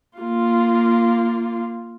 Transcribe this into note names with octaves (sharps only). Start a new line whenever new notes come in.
A#3 F4